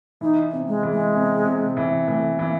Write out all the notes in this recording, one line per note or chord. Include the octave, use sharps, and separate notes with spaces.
E3 D#4
C3
G#3
E3
G#3
C3
C3
E3
E3 A3
E3 A#3